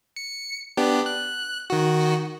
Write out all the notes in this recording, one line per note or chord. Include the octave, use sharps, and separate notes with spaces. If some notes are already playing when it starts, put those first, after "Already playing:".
C#7
B3 D4 G4
F#6
D#3 F#4